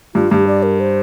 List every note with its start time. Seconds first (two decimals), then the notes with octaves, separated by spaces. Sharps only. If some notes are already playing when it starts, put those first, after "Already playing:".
0.15 G2 F4
0.31 G2 G4
0.47 D5
0.63 A#4
0.80 C5